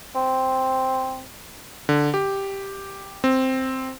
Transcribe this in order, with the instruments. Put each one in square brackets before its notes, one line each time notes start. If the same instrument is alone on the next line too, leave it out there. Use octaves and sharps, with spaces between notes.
[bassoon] C4
[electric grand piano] D3
G4
C4